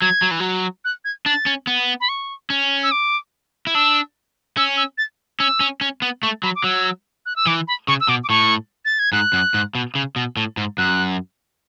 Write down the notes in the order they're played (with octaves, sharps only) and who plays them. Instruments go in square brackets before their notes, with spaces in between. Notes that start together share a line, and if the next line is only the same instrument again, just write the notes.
[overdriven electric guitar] F#3 [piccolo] G#6
[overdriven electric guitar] F#3
E3
F#3
[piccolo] F#6
G#6
[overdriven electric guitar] D4 [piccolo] A6
[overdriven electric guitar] C#4
B3
[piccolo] B5
C#6
[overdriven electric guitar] C#4
[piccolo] E6
D6
[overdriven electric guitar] E4
[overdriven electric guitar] D4 [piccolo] E6
[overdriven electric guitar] C#4 [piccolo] E6
[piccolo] E6
A6
[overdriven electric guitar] C#4 [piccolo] E6
[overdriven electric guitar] C#4
C#4
B3
[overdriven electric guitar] A3 [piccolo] C#6
[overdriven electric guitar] F#3 [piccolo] B5
[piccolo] D6
[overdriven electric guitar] F#3 [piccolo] E6
[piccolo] F#6
E6
[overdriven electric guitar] E3 [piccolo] D6
[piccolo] B5
[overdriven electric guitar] C#3 [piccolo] C#6
[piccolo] E6
[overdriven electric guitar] B2 [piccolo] D6
[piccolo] D6
[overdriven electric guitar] A2 [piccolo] C#6
[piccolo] A6
G#6
[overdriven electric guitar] G#2 [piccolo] F#6
[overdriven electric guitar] F#2
G#2
B2
C#3
B2
A2
G#2
[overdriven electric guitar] F#2 [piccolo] F#6